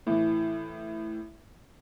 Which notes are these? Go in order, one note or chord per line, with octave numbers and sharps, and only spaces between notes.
A2 E3